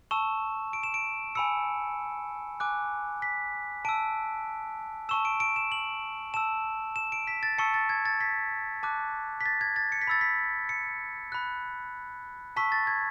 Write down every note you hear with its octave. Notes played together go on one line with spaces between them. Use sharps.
A5 C#6 E6 E7
D7
E7
D7
G#5 B5 E6 C#7
G#5 D6 F#6
B6
A5 E6 D7
A5 C#6 E6 E7
D7
D7
E7
F#7
A5 E6 E7
E7
D7
B6
A6
A5 C#6 E6 C#7
A6
G#6
A6
B6
A5 D6 F#6
B6
A6
G#6
A6
C#7
B6
B5 E6 A6
B6
C#7
B5 F#6
A5 C#6 E6 B6
A6
G#6